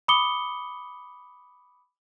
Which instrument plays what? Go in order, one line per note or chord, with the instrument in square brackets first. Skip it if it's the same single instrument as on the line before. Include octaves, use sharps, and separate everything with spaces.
[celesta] B5 D6 D#6 C#7 G7